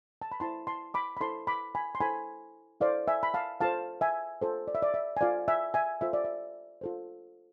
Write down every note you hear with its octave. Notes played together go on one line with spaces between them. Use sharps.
A5
B5
E4 A4 C5 A5 C6
A5 C6
B5 D6
B5
E4 A4 C5 A5 C6
B5 D6
G#5 B5
C6
E4 A4 C5 G#5 B5
E4 A4 C5 D5 F5
E5 G#5
B5
F5 A5
F4 A4 C5 F5 A5
E5 G#5
F4 A4 C5
D5
E5
D5
E5
G#5
F4 A4 C5 D5 F5
E5 G#5
E5 G#5
F4 A4 C5 E5
D5
E5
F4 A4 C5